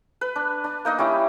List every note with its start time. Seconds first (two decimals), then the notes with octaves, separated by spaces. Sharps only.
0.21 B4
0.36 D4
0.64 D4
0.85 A#3 D#4 D#5
0.98 G3 C#4 E4